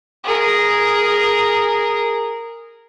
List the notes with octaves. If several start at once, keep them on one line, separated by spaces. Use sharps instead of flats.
G#4 A#4